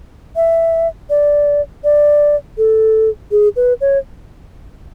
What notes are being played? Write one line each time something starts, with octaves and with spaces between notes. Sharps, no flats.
E5
D5
D5
A4
G#4
B4
C#5